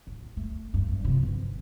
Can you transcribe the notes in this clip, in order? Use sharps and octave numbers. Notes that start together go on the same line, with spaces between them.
A1
A3
G2
C3 F3
G1